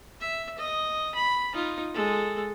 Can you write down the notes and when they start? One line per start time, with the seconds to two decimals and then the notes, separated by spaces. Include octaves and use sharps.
0.20 E5
0.58 D#5
1.15 B5
1.54 D#4 F4
1.94 G#3 A4